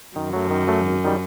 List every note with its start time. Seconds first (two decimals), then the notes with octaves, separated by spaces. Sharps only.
0.16 F#2 D#3
0.33 F#3 A3
0.50 D#3
0.67 F#3 A3
0.84 G#1
1.05 D#3 G3